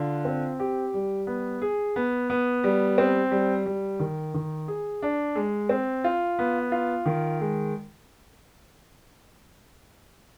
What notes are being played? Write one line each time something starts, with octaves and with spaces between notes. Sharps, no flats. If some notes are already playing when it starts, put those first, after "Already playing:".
Already playing: D3 F4
C4
G4
G3
B3
G#4
B3
B3
G3
C4
G3
G3
D#3
D#3
G#4
D4
G#3
C4
F4
B3
F4
D#3
G#3